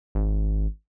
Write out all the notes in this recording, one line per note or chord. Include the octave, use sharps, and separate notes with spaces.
G#1